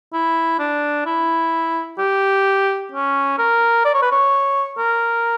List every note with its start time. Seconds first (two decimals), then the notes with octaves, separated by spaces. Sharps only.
0.13 E4
0.59 D4
1.06 E4
1.99 G4
2.92 C#4
3.38 A#4
3.85 D5
3.94 C#5
4.02 B4
4.12 C#5
4.78 A#4